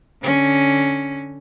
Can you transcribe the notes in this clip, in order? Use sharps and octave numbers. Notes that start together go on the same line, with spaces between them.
D3 C#4